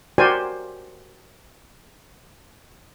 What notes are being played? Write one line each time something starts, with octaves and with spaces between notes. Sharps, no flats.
F#4 G4 A#4 C5 D5 G#5